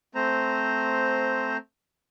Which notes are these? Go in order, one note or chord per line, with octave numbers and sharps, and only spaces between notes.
A3 C4 C5 A#5